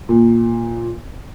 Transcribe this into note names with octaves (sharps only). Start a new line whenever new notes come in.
A#2